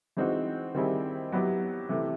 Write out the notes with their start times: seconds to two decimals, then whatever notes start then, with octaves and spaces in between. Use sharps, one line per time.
0.17 E3 G#3 C4 D#4 F#4
0.74 D#3 G3 C4 E4 G#4
1.32 F#3 B3 E4 G4
1.89 C3 E3 A3